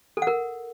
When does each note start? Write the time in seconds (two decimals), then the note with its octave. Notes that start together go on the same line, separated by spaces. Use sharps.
0.17 A4
0.22 F#5
0.27 A#4